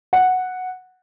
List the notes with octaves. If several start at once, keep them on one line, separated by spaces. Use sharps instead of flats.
F#5